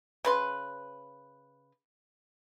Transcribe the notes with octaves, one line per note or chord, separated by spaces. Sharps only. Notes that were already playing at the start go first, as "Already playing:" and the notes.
C#3 B4 C6